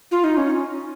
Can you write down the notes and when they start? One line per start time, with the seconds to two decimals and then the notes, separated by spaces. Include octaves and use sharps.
0.11 F4
0.24 D#4
0.37 C#4